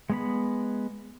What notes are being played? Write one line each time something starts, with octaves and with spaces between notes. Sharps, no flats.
G#3 B3 B5